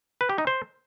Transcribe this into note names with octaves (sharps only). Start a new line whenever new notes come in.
B4
G4
D#4
C5